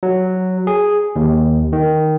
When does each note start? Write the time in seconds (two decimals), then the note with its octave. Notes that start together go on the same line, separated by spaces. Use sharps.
0.03 F#3
0.67 G#4
1.16 D#2
1.73 D#3